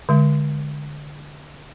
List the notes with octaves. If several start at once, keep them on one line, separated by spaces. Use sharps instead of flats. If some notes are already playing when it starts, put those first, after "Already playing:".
D3 G#3